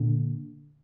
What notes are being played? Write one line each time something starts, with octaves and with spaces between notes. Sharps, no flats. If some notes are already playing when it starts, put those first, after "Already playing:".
Already playing: A#2 D3